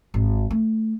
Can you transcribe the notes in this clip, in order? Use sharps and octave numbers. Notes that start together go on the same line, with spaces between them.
G#1
A3